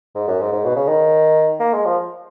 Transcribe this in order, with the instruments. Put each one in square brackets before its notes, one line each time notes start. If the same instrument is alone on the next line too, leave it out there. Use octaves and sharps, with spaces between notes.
[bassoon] G#2
F#2
G#2
G#2
B2
C#3
D#3
A#3
G#3
F3